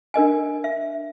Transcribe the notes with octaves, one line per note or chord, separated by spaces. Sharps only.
D4 A#4 D#5 G#5
E5